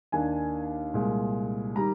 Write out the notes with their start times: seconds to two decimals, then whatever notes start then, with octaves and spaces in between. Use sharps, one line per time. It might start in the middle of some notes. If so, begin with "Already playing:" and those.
0.12 D#2 D#3 A#3 D4 G#5
0.94 C2 A#2 G#3
1.76 D#3 G3 A#5